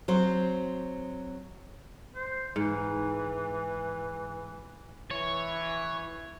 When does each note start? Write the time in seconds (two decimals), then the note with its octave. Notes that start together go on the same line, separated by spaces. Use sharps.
0.08 F#3 C4 C5
2.16 C5
2.56 G#2 E3
5.11 E3 C#5